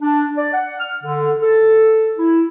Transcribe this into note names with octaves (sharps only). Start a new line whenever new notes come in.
D4
D5
F#5
F6
D3
A4
E4